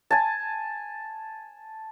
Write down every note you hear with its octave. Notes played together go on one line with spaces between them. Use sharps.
G#5 A5